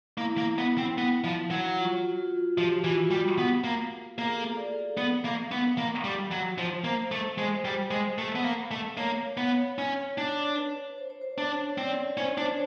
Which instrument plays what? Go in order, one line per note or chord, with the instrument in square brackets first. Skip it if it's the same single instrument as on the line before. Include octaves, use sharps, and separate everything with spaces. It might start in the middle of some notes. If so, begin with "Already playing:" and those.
[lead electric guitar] A#3 [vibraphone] E4
[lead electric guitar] A#3
B3
C4
B3
F3
F#3
[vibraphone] F4
F#4
F4
F4
[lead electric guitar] F3 [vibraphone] G4
[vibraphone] F#4
F4
[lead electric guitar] E3 [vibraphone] F#4
[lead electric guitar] G3
B3
A#3
[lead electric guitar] A#3 [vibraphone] G#4
[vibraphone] A4
D5
[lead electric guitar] B3
A#3
B3
A#3
G3
F#3
[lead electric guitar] F3 [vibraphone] C5
[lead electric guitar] A#3
A3
[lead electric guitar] G#3 [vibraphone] C5
[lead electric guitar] G3
G#3
A3
B3
A#3
A3
[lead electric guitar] A#3 [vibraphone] C#5
[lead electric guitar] B3 [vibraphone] C#5
[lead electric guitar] C#4 [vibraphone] C#5
[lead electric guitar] D4
[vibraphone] B4
C5
C#5
C5
[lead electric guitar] D4 [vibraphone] C#5
[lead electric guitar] C4 [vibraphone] D5
[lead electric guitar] C#4 [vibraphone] C5
[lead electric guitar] D4 [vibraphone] C#5